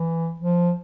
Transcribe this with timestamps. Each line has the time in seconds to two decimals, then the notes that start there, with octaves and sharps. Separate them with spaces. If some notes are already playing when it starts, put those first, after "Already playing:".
Already playing: E3
0.40 F3